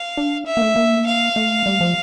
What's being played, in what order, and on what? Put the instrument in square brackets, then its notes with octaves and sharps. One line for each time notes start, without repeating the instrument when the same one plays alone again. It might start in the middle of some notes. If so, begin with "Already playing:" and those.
Already playing: [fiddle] F5
[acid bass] D4
[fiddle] E5
[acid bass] A#3
A3
A#3
[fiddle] F5
[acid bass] A3
G3
F3